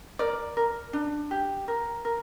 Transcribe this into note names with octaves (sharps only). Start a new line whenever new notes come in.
A#4 D5
A#4
D4
G4
A#4
A#4